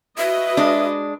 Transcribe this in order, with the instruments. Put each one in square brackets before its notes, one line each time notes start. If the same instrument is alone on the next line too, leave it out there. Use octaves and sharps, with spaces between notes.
[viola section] F#4 B4 D#5 [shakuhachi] E5
[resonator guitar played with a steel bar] G#3 D4